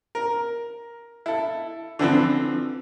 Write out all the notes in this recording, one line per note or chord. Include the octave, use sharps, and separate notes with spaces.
A#4
E4 A4
D3 E3 F3 C4